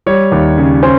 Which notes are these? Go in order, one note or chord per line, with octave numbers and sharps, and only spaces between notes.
G3 C#5
D#2
C#3
C#4 C5